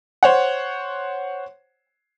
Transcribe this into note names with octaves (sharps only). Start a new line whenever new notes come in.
C5 C#5 F#5